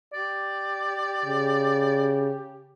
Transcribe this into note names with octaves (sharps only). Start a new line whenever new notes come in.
G4 D5
C#3